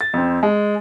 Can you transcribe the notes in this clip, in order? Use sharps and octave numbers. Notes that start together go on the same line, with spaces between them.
A6
F2 C4
G#3